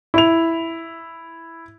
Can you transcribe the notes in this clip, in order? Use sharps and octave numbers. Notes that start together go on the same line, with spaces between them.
E4 F7